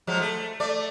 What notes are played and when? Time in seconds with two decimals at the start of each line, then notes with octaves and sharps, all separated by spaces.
0.07 F3 F#3 G#3
0.20 A3
0.60 A3 D5